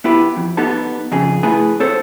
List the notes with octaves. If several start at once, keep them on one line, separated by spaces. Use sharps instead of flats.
B3 E4 G4 B4
F2
B3 D#4 G4 A4 A5
F2 C#3 G#4
A3 E4 G#4 B4 G#5
C4 A4 C5 C#5